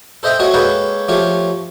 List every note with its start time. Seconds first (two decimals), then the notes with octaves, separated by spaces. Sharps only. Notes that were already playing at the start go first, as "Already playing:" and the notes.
0.23 A4 C5 D#5 E5 G5
0.39 A3 C4 C#4 F#4 C#5 D#5
0.54 G#3 A#3 A4 B4 C#5 G5
1.08 F3 A3 F4 G4 C#5